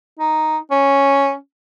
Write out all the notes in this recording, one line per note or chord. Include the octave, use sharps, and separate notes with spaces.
D#4
C#4